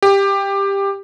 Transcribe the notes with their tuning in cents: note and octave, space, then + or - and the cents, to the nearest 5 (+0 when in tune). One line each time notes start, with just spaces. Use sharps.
G4 +15